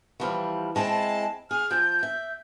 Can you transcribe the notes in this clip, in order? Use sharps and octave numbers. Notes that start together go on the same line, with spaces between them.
E3 F3 G3
G#3 C4 E4 A5
G#4 F6
F3 G6
E5